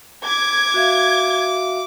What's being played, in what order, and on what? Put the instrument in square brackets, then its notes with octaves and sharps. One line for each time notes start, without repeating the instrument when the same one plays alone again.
[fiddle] D6 [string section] G#6
[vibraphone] F#4 E5 F5